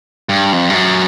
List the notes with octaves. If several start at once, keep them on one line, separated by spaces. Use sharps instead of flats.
G2
F2
G2
F#2